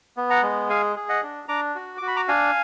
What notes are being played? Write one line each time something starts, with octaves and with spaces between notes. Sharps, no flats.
B3
F#5 A#5
G#3
G#4 F5 G#5
G#4
D#5 F#5
D4
D4 A#5 D6
F#4
F#4 D6
B5
A#5 D6
D4 F5 G#5